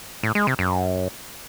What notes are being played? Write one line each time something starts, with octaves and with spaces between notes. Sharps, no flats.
A2
G#3
C3
F#2